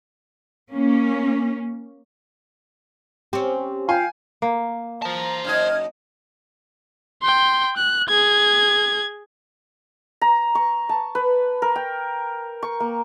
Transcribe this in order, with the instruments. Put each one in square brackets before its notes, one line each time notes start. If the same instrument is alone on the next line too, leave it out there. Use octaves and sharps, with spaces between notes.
[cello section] A#3 C#4
[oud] C4 C#4 [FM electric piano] G4
[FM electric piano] F4 [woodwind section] F5 G5 [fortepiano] G#5
[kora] A#3
[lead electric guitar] C5 A5 [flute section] A#5
[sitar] F#2 D#4 D#5 [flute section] F6 G#6
[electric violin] G5 C6
F#6
G#4 G#6
[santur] A#5
C#6
A5
B4
A#4
G5
C#6
A#3